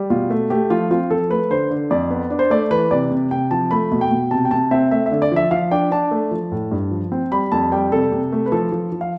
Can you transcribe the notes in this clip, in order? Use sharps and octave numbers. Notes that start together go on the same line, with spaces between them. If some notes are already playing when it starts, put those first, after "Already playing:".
Already playing: G3
B2 F4
A3
A3 G4
F3 F4
C4 F4
F3 A4
A3 B4
D3 C5
D3
F2 D5
B3
D4
C5
A3 D5
E3 B4
C3 D5
C3
C3 G5
F3 A5
A3 B5
B2
G5
B2
C3 A5
G5
C3 A5
C4 E5
A3 E5
E5
D3
D5
F3 E5
F3 F5
D4 G5
D4 A5
A3
F3
A2
G2
F3
C4
G3 B5
F2 A5
G3 G5
C3 A4
C3
A3
B4
F3 A4
F3
F3
F5